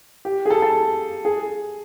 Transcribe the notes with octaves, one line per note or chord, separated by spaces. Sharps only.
G4
G#4
A4
A4
G#4